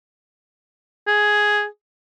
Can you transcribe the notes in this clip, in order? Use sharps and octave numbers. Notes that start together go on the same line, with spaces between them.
G#4